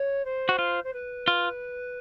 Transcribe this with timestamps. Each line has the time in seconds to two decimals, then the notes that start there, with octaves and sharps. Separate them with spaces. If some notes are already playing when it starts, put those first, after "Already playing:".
Already playing: C#5
0.25 C5
0.49 F#4
0.59 F4
0.84 C5
0.93 B4
1.28 F4